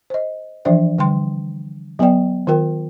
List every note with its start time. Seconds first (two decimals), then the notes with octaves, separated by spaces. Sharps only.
0.10 C5 D#5
0.65 E3 F3 D4 C5 E5 G5
0.98 D3 G3 G5 C6
1.99 F#3 B3 B4 D5 G5
2.47 D#3 F4 A#4 G5